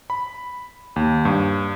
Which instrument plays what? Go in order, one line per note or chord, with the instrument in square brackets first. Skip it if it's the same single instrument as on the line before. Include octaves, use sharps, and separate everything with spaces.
[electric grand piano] B5
D#2
G2